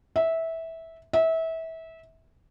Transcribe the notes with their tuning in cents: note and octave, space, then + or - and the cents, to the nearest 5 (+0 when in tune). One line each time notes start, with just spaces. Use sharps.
E5 -15
E5 -25